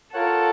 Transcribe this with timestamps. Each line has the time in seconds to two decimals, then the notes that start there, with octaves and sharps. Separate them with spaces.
0.13 F4 A4 A#4 C#5 F#5